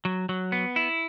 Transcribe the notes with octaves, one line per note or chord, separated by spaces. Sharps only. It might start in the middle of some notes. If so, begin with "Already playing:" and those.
F#3
F#3
B3
E4